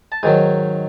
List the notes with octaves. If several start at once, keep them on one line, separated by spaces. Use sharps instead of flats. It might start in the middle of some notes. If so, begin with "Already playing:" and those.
A5
G#2 D#3 F#3 G#5